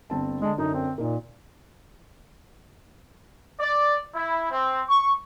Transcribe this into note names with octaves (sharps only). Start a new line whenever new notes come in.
G1 C4 A5
D3 G#3 A5
F#2 D3 D#4
C4
A#2 A#3 D#4
D5
E4
C4
C#6